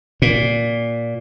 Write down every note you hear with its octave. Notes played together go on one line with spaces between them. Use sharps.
A#2